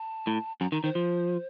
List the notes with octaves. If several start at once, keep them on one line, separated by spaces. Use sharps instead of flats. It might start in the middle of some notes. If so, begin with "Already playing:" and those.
Already playing: A5
A2
F#2 A#5
D#3 A#5
D#3 C5
F3